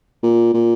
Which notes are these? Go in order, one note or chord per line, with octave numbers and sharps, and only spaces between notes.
A#2
A#2